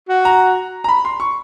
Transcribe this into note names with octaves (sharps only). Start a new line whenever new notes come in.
F#4
A#5
A#5
B5
C6
C#6